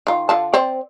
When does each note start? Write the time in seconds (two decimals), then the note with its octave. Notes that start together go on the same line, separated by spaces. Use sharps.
0.07 D#3 F4
0.29 D3 F4 A5
0.54 C4 C5 D5